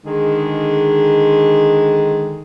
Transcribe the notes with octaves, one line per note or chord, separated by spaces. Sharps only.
D3 D#3 G#3 G#4